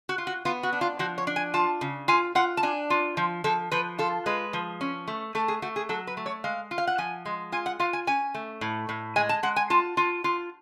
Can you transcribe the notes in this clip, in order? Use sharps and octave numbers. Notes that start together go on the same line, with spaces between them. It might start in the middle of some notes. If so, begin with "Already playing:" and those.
F#4
F4
F#4
B3 F4
F#4
D4
F4
F3 F#4
C#5
D4
G#5
F4 A5
C#3
F4 G#5
F4 F#5
A5
D4 G#5
F4
F3
F3 A4
F3 B4
F4 A4
G#3 B4
F3
C#4
A3
A3 A4
G#4
A3 F#4
G#4
F#3 A4
B4
A3
C#5
G#3 F5
F4
F5
F#5
F3 G#5
G#3
F4 G#5
F#5
F4 F5
G#5
C#4 G#5
A3
A2
A2
G#3 G#5
A5
G#3 F#5
G#5
F4 A5
F4
F4